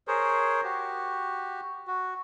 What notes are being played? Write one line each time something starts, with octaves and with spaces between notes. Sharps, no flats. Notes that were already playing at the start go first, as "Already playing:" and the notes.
G#4 A#4 C5 C#5
F#4 G4
F#4